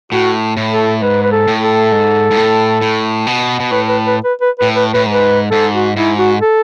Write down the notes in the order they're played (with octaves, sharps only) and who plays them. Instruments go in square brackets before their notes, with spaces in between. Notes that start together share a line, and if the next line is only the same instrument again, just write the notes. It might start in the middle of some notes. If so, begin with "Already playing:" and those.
[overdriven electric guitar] A2 [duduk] F#4
[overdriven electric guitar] A2
[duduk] A4
[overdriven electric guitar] G#2 [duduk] B4
[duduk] B4
A4
[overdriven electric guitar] A2
[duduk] A4
[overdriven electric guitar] G#2
G#2
A2
A2
B2
B2
[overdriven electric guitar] A2 [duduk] B4
[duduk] B4
B4
B4
B4
[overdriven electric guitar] A2 [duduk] B4
[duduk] B4
[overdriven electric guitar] A2 [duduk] B4
[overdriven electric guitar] G#2
[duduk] B4
[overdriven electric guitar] G#2 [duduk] A4
[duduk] F#4
[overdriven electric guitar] G#2 [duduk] E4
[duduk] F#4
A4